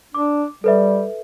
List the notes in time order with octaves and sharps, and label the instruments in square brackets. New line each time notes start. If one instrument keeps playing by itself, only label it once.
[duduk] D4 [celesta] D6
[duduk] G3 [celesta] A4 B4 E5